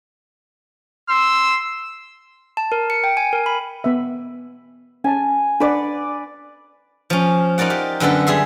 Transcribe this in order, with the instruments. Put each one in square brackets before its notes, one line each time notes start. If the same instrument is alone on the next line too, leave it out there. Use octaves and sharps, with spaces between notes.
[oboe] C6 [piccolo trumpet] E6
[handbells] A5
A#4
C#7
G5
G#5
A#4
B5
[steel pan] B3 E5
[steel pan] C#4 A5 [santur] G#5
[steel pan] D4 F#5 [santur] B4 D5
[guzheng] F3 C#4
D#4 F4 A#4 D5 F#5
G4
F#2 D3 B3 A4 B4
G3 G#4 E5 C6